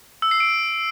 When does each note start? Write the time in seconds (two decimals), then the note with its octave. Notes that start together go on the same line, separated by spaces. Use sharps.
0.22 E6
0.31 C7
0.40 D7